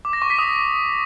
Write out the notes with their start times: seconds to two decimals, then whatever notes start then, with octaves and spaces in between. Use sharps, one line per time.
0.05 D6
0.13 A#6
0.22 C#6
0.30 B6
0.39 D#6